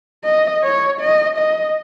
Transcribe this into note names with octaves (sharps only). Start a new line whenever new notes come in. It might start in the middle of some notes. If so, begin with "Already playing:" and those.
D#5
C#5
D#5
D#5